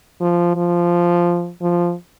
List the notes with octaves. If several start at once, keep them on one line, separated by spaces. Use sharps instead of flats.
F3
F3
F3